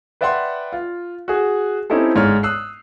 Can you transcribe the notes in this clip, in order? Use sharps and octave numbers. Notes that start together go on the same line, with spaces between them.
B4 D5 E5 F#5 G5 C6
F4
F#4 G#4
C4 C#4 D#4 E4 G4 A4
G1 G#2 C#5 D5 F6
D#6 E6 F#6 C7